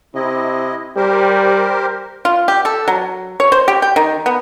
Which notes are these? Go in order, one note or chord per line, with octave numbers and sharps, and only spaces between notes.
C3 E4 D#5
G3 G4 A#4 C5
F4
G4
A4
F#3
C#5
C5
G4
G5
D#3
B3